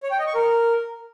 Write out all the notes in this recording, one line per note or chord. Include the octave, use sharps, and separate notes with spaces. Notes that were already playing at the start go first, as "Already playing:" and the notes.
C#5
G5
D#5
C#6
A#4